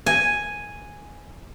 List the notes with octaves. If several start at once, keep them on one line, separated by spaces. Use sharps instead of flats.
G#5